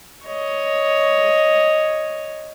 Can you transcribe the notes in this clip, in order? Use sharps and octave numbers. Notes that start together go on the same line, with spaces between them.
C#5 D#5